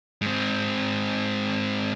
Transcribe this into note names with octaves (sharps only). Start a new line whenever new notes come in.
G#2 C4